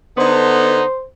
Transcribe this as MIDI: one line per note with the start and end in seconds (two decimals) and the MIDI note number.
0.18 0.83 50
0.18 0.83 59
0.18 0.83 63
0.18 1.04 72